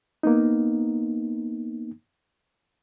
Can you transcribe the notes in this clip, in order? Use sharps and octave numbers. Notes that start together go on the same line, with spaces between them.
A#3 B3 D#4